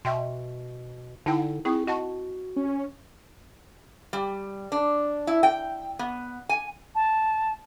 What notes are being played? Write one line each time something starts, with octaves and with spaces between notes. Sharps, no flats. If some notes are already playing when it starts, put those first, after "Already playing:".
B2 E5 G5 C6
D3 D#4 E4 G5
C4 E4 G#4 C#6
F#4 D#5 F#5 A5
C#4
G3
D4
E4
G5
B3
G#5
A5